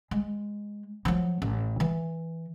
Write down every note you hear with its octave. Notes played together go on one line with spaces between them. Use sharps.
G#3
F3 F#3
A1
E3